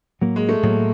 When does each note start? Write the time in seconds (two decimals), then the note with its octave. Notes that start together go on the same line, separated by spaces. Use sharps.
0.21 A2 F#3 A#3
0.36 G#3
0.49 A3
0.63 A2 F#3 A#3